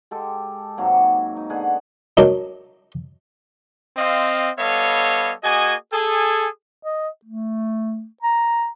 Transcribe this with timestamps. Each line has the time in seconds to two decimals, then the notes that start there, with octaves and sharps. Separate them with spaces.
0.11 G#3 G4 A4
0.77 G#2 C3 F#3 A#3
1.36 D#4
1.50 B2 D3 G#4 F#5
2.17 F#3 A#3 D4 D#4
3.97 C4 D#5 F5
4.58 G3 B3 A4 C#5 D#5 F5
5.43 A#3 F#4 G#4 D#5 G#5
5.92 G#4 A4 G#5
6.83 D#5
7.25 A3
8.22 A#5